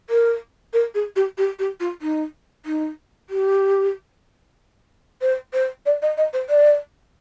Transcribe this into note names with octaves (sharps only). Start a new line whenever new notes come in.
A#4
A#4
G#4
G4
G4
G4
F4
D#4
D#4
G4
C5
C5
D5
D#5
D#5
C5
D5